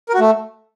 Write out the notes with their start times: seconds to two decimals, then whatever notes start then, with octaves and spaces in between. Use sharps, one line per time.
0.09 A#4
0.14 F#4
0.20 A3